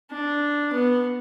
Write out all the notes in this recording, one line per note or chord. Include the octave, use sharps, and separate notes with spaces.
D4
B3